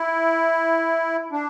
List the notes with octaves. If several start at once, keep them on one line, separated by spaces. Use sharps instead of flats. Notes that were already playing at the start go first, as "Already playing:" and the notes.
Already playing: E4
D4